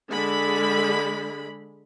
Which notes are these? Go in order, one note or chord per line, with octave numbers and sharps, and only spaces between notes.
D3 G#3 B5